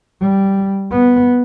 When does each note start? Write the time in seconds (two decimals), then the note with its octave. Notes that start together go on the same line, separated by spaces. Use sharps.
0.21 G3
0.91 B3